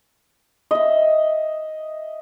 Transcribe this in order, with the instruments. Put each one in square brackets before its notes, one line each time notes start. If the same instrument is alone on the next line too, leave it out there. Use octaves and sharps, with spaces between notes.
[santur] D#5 E5